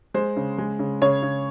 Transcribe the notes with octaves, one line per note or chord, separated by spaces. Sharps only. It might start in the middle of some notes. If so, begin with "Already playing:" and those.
G#3 C5
C#3
G#3
C#3
C#3 C#5
C#3